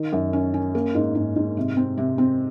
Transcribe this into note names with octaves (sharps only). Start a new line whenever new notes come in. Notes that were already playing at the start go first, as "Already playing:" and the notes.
Already playing: D#3
F#2
C#4
C#4
A#3
G#2
G#2
G#2
C3
C4
C3
C4